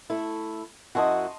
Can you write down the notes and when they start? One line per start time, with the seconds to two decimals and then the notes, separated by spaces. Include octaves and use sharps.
0.10 A3 E4
0.95 F#2 E4 F#4 D#5 A5 C6